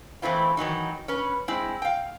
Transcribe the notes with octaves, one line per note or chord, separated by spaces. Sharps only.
E3 A3 C4 E4 F4
D#3 E3 F#3 D#4
C#4 B4
G#3 C4 E4
F5 G5